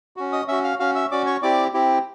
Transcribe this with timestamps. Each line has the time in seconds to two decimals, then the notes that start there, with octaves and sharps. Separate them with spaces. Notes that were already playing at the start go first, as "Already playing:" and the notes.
0.16 C#4 F#4
0.33 D#5 D#6
0.48 C#4 F#4 E5 E6
0.64 F5 F6
0.79 C#4 F#4 F5 F6
0.95 E5 E6
1.11 C#4 F#4 D5 D6
1.26 C#5 C#6
1.42 C4 E4 G4 D5 D6
1.73 C4 E4 G4